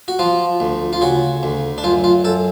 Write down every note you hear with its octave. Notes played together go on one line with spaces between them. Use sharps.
F#4
F3 F4
D2
F4
C#3 F#4
D2
D4
F#2 F4
F4
F#2 A4